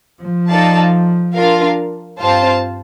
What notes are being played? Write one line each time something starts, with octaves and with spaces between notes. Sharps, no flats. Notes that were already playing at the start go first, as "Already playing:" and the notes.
F3
D#4 A4 D5 F5 A5
D4 F4 A#4 F5
G2 C4 F4 C5 F5 A5